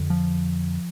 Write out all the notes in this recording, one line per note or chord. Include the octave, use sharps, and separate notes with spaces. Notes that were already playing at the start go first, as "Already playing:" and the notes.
Already playing: F2 D3
F3